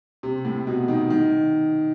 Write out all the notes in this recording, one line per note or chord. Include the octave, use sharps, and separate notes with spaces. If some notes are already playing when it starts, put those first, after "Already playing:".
C3
A2
B2
D#3
D#3